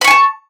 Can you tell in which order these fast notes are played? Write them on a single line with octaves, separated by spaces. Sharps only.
B5 C#6 G#5 A5